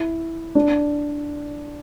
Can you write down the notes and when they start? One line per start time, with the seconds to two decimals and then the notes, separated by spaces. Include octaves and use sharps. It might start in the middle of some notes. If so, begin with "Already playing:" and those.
Already playing: E4
0.55 D4